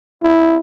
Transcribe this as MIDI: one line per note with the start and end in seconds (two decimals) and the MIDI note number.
0.22 0.58 64